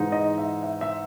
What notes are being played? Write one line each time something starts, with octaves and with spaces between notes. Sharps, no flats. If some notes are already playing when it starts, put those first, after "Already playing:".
Already playing: G#2 E3 G#3 D#4
D#5
E5
E5
E5